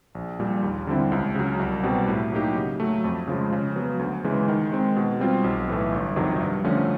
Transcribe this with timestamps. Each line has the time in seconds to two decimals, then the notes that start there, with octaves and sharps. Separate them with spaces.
0.15 A#1
0.40 A#2 G3
0.63 D#2
0.87 D3 G3 C4 E4
1.12 C#2
1.35 C#3 F#3
1.59 C2
1.83 B2 G3 C4
2.08 A2
2.32 F#3 A#3 D#4 G4
2.56 C#3
2.80 F#3 A3
3.04 F2
3.27 C#3 F3 G#3
3.52 C#3
3.76 F#3 B3
3.99 D2
4.24 C#3 E3 G#3
4.48 D#3
4.72 G#3 C4
4.96 B2
5.20 G3 C4 F4
5.44 B1
5.68 A2 E3 A3
5.92 G1
6.16 F2 C3 D#3 F#3
6.40 G2
6.64 D3 F3 A3 C#4